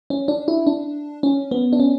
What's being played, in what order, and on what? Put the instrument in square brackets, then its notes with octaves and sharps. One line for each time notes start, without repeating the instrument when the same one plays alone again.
[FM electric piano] C#4
D4
E4
D4
C#4
B3
D4
C#4